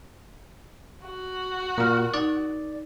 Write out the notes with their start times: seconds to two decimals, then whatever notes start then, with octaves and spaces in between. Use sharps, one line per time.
1.05 F#4
1.78 A#2 A#4 F6
2.14 D#4 D5